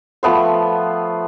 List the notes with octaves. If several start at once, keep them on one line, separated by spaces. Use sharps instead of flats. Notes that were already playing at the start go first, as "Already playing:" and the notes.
F3 A3 B3 C5